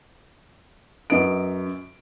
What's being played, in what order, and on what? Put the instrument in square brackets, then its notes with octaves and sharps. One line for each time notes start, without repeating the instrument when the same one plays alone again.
[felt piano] F#2 B4 D#5 D7